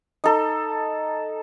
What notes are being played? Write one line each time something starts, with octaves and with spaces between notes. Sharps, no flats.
D#4 A4